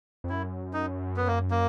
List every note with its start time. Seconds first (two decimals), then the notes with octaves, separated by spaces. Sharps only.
0.24 F2
0.29 F#2 E4
0.73 D#4
1.17 B3
1.27 A#3
1.51 A#3